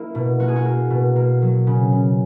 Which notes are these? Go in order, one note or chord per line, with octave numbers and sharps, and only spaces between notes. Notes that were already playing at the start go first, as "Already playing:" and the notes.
Already playing: A#3 E4
B2
A#3 F#4
G#4
F#4
A#3
B2
A#3
F#3
C#3
C#3